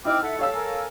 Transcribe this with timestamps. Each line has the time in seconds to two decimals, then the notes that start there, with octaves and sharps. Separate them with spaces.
0.05 C4 D#4 E4 G5 D6 F6
0.23 A4 E5 F#5
0.39 G4 C#5 F5 E6
0.53 A#4 G#5